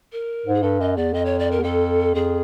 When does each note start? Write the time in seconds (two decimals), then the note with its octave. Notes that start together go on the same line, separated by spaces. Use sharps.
0.12 A#4
0.46 G#2
0.54 G#4
0.62 G2 A4
0.80 F#2 D#5
0.97 E2 D5
1.13 F2 D#5
1.25 C#5
1.39 D5
1.51 A#4
1.60 E2
1.64 F2 A4
2.15 F2 G#4